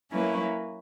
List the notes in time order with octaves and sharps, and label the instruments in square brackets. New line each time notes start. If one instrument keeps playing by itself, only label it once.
[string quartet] F#3 A#3 C#4 E4 B4